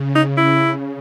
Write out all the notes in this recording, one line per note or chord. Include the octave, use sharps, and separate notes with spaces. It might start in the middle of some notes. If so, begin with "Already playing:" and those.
Already playing: C#3
D#4
E4